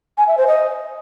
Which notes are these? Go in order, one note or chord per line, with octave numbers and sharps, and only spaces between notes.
G#5
E5
C5
D#5